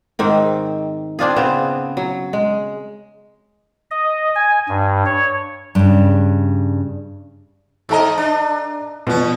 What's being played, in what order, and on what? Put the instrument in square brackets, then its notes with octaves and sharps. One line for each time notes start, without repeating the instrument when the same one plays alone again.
[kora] G#2 D#3 C4
C4 D4 F4 G#4
C#3 B3 C4
F#3
G#3
[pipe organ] D#5
G#5
G2
C#5
[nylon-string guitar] G2 C#3
[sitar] G#2 F4 D#5 [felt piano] A4 A#5
[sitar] D4
[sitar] E2 C#4 [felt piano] B2 F3 B3